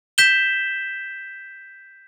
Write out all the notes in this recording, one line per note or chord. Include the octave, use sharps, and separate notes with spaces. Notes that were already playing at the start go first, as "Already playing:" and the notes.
G6 B6 E7 G7